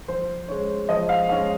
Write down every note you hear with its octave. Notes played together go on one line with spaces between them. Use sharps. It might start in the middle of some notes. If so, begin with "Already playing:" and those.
F3 C5
G#3 C#4 C#5
F3 D#5
F5
G#3 C#4 F5